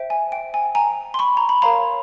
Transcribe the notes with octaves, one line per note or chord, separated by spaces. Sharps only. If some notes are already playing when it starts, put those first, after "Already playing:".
Already playing: C5 E5 G5
G#5
G5
G#5
G#5 A#5
C6
B5 C#6
A#5
B5
A#4 C#5 F5 A#5 C6